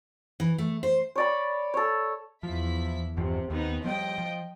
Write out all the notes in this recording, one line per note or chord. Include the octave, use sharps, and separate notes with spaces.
E3
A3
C5
C#5 D5 B5
A4 C#5
E2 F3 E4 B6
G1 E2 C3 F3
D#2 B3 D#4
F3 G3 D#5 G5
F3